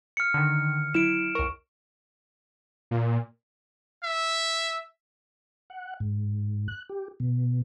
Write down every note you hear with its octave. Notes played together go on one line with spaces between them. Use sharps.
F6 C#7
D3 D#3
F#3 E4 D7 E7
C#2 A#4 C#6
A#2
E5
F#5
G#2
F#6
G4
B2